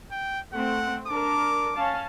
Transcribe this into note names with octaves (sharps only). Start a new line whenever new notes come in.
G5
A3 C4 F#5
D4 A#4 D6
C#4 F5 A5